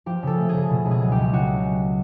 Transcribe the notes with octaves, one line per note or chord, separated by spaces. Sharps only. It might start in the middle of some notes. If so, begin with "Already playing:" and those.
F3 G4
C#3 A4
A3
C#3 G#4
B2
C#2
G#4
F#3
G4
C#2
C#3 F#4